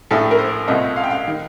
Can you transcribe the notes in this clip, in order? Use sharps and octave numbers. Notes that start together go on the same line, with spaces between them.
A#1 A2 A3 A4
A#4
C5
C2 A#2 A3 D#5
F5
G5
F5
D#3